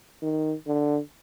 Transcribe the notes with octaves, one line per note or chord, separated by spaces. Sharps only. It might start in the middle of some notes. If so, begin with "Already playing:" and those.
D#3
D3